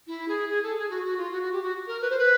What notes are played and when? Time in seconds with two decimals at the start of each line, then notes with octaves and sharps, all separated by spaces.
0.07 E4
0.28 G#4
0.49 G#4
0.63 A4
0.77 G#4
0.90 F#4
1.04 F#4
1.18 F4
1.32 F#4
1.42 F#4
1.52 G4
1.63 F#4
1.87 A#4
2.01 B4
2.10 C5
2.19 B4